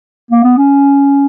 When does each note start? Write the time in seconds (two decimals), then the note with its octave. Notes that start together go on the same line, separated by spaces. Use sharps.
0.31 A#3
0.44 B3
0.57 C#4